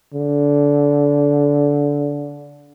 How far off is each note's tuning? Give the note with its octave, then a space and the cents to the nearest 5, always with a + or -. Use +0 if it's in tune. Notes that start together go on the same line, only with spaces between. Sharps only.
D3 -20